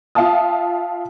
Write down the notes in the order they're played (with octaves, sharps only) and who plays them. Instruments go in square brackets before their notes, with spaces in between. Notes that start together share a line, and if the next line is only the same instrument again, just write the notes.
[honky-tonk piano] F4 E5 F5 G5 A5 D#6